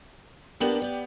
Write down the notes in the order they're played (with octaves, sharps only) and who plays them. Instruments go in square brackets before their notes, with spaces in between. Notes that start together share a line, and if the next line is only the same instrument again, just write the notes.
[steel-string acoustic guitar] A#3 D4 [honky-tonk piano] B3 G4 F#7
[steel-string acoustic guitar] D5